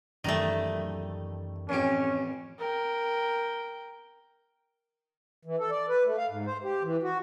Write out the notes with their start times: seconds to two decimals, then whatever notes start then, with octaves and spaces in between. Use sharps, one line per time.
0.24 F#2 D#3 E3 F#3 G3 A3 D#5
1.69 A1 F2 C#4 G4
2.58 A#4 G5
5.45 E3
5.59 A4
5.71 D5
5.89 B4
6.06 A3
6.18 F5
6.30 G#2
6.47 C5
6.64 G4
6.83 E3
7.03 F#4